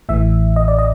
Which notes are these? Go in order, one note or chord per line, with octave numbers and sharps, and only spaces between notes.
A1 A2 E3 E5
D#5
D5
D#5